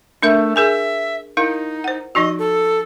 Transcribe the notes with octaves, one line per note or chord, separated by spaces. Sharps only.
A3 D4 A#4 E5
G#4 A#4 E5 G#5
D#4 E4 A#4 F5
C5 F#5
F3 D#4 F#4 D#5
A4